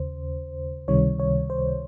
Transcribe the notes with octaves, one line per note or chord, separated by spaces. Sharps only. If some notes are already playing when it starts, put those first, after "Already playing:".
Already playing: D#2 C#3 C5
C#2 C3 D#3 G3 C#5
C#5
C5